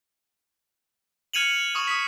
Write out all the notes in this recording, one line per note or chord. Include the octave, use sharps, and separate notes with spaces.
F6 G#6 C#7 D#7 F7 F#7
C#6 D#6
D#6 B6